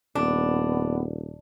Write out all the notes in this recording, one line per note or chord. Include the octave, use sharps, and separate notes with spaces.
D#1 B3 D4